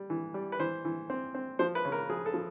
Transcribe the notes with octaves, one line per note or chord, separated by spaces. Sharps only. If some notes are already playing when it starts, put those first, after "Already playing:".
Already playing: G3
E3
G3
B4
E3 C5
E3
C4
C4
F3 C5
B4
C#3
A#4
F3 G#4
A4
F3